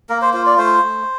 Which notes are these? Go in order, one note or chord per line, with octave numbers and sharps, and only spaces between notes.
A#3 A#4
C5
F4 C5
D5
A3 C5
A3